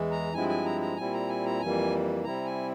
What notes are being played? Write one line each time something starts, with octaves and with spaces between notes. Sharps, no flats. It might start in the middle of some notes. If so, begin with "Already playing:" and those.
Already playing: E2 E3 G#3
A#5
G2 F3 G#3 C4 E4 G#5
G#5
A#5
A#5
A#2 G3 C4 E4 G#5
A#5
G#5
A#5
F2 E3 G3 A#3 G#5
C3 G3 C4 E4 A#5
G#5